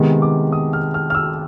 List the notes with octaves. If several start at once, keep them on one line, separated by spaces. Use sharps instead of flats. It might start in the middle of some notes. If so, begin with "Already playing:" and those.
Already playing: C3 D#3 G#3 B3
D6
D#6
F6
F6
F6
E6